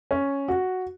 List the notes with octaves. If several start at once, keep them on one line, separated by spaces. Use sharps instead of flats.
C#4
F#4